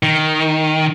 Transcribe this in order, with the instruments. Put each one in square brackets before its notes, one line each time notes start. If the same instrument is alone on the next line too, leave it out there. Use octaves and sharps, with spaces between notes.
[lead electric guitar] D#3